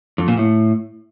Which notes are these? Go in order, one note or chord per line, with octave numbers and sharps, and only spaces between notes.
F2
A#2
A2